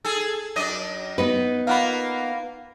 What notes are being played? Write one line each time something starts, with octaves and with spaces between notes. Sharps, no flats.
G#4 A4
F#2 D4 D#5
B3 D#4 B4
A#3 F4 F5 F#5 B5